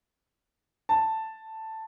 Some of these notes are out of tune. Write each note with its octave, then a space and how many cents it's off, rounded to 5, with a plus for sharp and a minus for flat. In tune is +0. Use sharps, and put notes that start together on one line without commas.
A5 +5